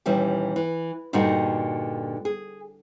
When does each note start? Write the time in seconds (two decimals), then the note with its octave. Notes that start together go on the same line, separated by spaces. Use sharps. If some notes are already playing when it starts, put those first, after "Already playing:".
0.06 D#2 A#2 E3 G3 C#4
0.56 E3
1.13 G2 A#2 D3 D#4 F#4 G4
2.25 G#4